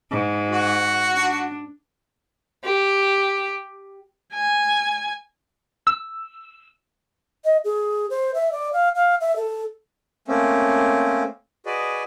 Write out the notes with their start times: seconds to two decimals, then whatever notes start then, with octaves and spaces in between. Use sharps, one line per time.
0.11 G#2
0.50 F#4
1.14 D4
2.64 G4
4.34 G#5
5.87 E6
7.45 D#5
7.65 G#4
8.10 C5
8.34 E5
8.52 D5
8.73 F5
8.95 F5
9.21 E5
9.36 A4
10.28 A3 A#3 C4 C#4
11.66 F#4 G#4 B4 D5 D#5